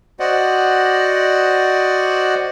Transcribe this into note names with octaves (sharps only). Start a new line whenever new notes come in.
F#4 C5 D5 D#5 F#5